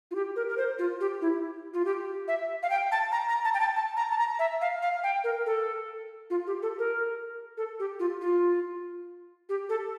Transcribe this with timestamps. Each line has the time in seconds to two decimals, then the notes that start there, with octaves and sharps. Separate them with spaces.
0.11 F4
0.15 G4
0.36 A#4
0.49 A#4
0.57 C5
0.79 F4
1.00 G4
1.21 E4
1.74 F4
1.85 G4
2.28 E5
2.63 F5
2.70 G5
2.92 A5
3.12 A#5
3.29 A#5
3.45 A5
3.54 G5
3.60 A5
3.76 A5
3.97 A#5
4.11 A5
4.18 A#5
4.39 E5
4.61 F5
4.82 F5
5.04 G5
5.24 A#4
5.46 A4
6.30 F4
6.47 G4
6.62 A4
6.79 A#4
7.57 A4
7.79 G4
8.00 F4
8.21 F4
9.49 G4
9.69 A4